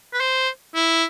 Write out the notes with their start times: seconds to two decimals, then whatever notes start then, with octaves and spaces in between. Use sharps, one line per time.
0.14 B4
0.20 C5
0.75 E4